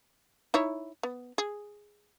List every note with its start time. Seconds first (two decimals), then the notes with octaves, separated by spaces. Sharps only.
0.54 D#4 E4 C#5
1.03 B3
1.38 G#4